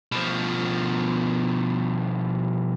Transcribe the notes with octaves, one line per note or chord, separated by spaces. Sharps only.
B2 F3